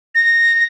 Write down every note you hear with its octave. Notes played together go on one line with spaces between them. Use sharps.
A#6